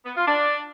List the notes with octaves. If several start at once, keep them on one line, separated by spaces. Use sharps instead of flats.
B3
F4
D4